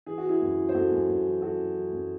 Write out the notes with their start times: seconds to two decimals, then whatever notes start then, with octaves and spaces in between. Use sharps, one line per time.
0.06 E3 G#4
0.18 F#4
0.24 E3
0.29 E4 G#4
0.41 F#2
0.57 E3
0.69 C5
0.74 F#2 F#4 A4
0.92 F#2
1.08 F#2
1.25 E3
1.42 E3 F#4 A4
1.59 E3
1.76 E3
1.93 F#2